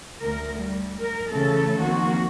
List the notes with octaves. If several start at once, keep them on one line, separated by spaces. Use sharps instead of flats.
D2 A#4
G3
A#4
C#3 E3 A3 A4
D#3 F3 A#3 C4 F#4